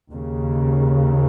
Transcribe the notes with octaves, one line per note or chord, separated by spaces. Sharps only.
D#2 C#3